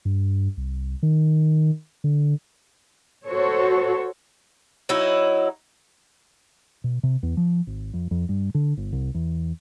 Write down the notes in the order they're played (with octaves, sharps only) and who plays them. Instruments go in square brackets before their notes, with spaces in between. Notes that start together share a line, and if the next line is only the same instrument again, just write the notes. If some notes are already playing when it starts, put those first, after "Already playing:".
[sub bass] G2
C2
D#3
D3
[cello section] F#4 A4 C5 C#5
[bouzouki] F#3 D#4 E4
[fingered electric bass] B2
C3
E2
F3
G#1
F2
F2
G2
D3
G1
C2
E2